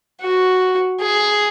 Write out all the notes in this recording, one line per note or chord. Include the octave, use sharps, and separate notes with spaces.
F#4
G#4